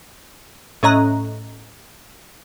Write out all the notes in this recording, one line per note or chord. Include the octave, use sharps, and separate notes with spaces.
A2 C#4 D#5 A#5 F#6